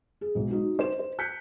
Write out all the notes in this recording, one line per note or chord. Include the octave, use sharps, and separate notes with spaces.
G#4
B1 G#2
D#4 F#4
C5 E7
C5
F#6 G6 B6 C#7